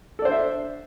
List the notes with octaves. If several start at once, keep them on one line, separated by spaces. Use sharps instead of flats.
D4 A4 C5 D5 E5